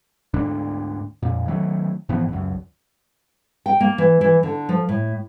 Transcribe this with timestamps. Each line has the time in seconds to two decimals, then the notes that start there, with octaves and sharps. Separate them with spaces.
0.34 D2 G#2 D3 D4
1.23 F2 A#2
1.47 D#3 F#3 A3
2.09 G#2 E3 F3 B3
2.29 C#2 F#2
3.66 G5
3.81 A#3
3.98 E3
4.21 E3
4.43 D3
4.69 F3
4.89 A2